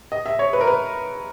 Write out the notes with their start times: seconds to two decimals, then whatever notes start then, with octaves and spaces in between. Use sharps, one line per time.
0.12 D#5
0.26 E5
0.39 C#5
0.53 B4
0.61 A#4
0.67 B4